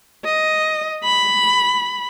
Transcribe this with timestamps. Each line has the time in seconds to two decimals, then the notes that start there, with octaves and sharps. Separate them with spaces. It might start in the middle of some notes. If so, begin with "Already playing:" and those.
0.25 D#5
1.04 B5